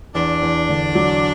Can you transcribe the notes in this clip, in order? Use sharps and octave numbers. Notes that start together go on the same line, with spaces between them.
E2 D4
E2
D3
F#3